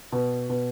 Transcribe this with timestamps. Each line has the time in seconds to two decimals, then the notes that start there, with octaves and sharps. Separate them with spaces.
0.12 B2
0.50 B2